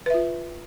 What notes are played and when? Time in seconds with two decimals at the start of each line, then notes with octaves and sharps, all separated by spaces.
0.06 B4
0.10 E5
0.14 F4